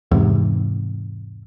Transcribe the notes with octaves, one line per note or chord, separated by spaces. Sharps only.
E2 G#2 C3